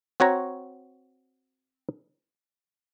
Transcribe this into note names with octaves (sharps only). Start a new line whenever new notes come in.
C4 F#4 C#5 A#5